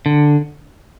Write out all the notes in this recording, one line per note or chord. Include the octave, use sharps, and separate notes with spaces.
D3